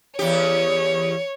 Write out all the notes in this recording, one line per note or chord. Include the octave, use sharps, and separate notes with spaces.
E2 G4 C#5